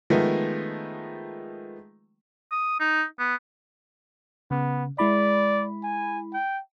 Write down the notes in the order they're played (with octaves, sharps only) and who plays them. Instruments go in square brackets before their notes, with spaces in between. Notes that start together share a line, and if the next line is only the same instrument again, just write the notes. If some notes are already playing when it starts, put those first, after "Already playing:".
[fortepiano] D#3 F3 G#3 A3 B3
[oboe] D#6
D#4
B3
[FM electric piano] C#3 [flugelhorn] B3
[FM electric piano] G#3 E4 B5 [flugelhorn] D5
[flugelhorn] G#5
G5